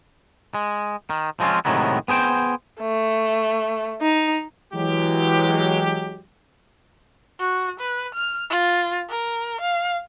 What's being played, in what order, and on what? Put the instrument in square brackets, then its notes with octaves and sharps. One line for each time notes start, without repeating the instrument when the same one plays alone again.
[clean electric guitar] G#3
D#3
F3 G#3 C4 C#4 F4
A2 C3 D#3 F#3 G#3 B3
B3 G#4 C5 G5
[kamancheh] A3
D#4
[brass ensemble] E3 F#3 G#3 G4
[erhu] F#4
B4
F6
F4
A#4
F5